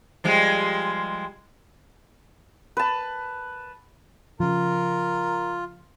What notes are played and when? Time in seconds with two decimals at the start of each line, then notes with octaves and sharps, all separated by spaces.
0.24 F3 G3 G#3
2.77 B4 A5
4.40 C#3 F3 F4 A#4